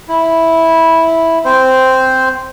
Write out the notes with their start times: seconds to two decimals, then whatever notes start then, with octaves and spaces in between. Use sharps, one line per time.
0.08 E4
1.45 C4 C5